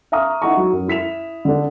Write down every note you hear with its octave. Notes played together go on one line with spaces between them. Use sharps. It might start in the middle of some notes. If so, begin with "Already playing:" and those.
E5 F5 A#5 C#6 D#6 F6
D#4 E4 F#5 A#5 C#6
F#3
F#2
E4 B6 E7 F7
D3 D4